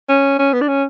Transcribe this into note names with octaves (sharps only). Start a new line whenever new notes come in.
C#4
C#4
B3
D4
C#4